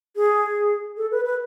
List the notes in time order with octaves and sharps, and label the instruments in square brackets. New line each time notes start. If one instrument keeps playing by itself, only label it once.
[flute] G#4
A4
B4
B4